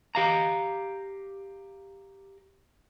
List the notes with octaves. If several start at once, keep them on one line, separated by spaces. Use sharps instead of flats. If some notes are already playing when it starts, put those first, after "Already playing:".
G4 F5 A#5